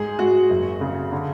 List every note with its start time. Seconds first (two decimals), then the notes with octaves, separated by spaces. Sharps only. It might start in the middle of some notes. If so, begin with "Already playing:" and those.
Already playing: G#2 G#4
0.19 G#2 F#4
0.50 F#1
0.81 C#3
1.12 D3